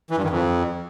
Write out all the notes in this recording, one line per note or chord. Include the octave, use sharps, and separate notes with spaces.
E3
G2
D#3
F2